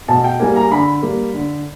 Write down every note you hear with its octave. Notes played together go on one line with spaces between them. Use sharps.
B2 A5
G5
G3 A#3 G#5
A#5
D3 B5
G3 A#3
D3